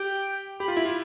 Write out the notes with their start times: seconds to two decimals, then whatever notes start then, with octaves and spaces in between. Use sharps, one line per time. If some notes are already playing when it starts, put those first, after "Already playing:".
Already playing: G4 G5
0.60 G4 B5
0.68 F4
0.77 E4
0.85 F4